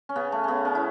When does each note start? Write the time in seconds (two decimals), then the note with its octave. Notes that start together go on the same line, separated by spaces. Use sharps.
0.09 C#4
0.16 C#3 B3
0.32 A3
0.44 C#3 B3 C#4
0.65 C#4
0.75 E4